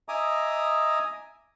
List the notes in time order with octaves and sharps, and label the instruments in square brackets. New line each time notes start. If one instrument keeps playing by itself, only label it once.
[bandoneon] D#5 E5 G#5 A#5 D6 D#6